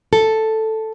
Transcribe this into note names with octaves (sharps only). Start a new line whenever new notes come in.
A4